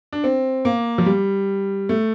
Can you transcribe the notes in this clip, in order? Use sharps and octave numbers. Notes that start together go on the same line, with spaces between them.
D4
C4
A#3
F3
G3
A3